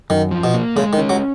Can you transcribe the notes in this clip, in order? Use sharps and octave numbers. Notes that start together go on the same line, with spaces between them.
F#2 D#3
F3
B2
A#3
C#3 G#3
D#3
C#4
F#3